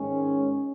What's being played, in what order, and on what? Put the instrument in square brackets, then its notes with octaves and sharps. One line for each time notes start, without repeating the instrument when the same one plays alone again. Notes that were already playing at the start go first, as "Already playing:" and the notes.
Already playing: [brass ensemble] G#2 D#3 G#3 C#4